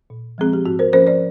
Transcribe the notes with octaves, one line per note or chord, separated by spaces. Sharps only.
A#2
F3 G#3 C4 G#4
G4
G#2 F#4
A#4 C5
F3 A#3 C#4 A#4 C5
C5 D5